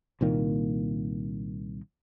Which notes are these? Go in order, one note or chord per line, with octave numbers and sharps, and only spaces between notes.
C2 A#2 D#3 A#3